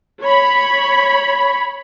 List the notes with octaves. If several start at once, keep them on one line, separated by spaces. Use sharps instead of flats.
C#5 B5